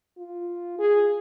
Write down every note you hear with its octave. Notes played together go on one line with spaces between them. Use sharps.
F4
G#4